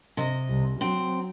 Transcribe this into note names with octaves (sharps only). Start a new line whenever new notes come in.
C3 D#5
C2
F#3 C4